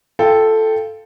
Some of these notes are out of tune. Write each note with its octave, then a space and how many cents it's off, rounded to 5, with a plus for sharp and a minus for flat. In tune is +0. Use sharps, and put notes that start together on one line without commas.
F4 -15 A4 +0 G5 +0